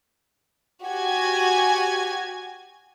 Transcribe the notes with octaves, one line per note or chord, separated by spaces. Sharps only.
F#4 G4 G#5 G#6